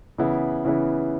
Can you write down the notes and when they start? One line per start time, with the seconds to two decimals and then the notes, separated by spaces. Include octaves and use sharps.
0.18 C#3 E3 B3 E4
0.65 C#3 E3 B3 E4